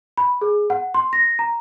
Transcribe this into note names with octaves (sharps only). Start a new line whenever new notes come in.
B5
G#4
F#5
C6
A#6
A#5